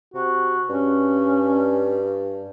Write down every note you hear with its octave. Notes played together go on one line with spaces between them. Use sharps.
C3 F#4
G2 C#4